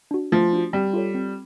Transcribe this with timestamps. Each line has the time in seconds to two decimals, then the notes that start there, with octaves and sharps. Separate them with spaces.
0.11 D4 F#4
0.32 F3 A3
0.53 D4 F#4
0.73 G3 C4
0.93 F4 A4 C#5
1.15 C4